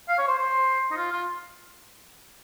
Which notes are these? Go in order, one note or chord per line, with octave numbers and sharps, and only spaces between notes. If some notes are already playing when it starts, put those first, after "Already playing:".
F5
C#5
C5
C5
D#4
F4
F4